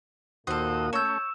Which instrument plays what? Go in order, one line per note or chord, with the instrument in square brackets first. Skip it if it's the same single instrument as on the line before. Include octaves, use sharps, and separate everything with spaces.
[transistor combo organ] D#2 F#4 D#6 [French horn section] A#2 A#3 [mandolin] A4 C5
[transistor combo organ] A3 C#4 [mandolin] C#5 G6 [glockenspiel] E6 E7